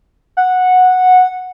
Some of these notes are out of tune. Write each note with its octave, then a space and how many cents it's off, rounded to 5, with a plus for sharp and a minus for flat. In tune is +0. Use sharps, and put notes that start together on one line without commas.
F#5 -10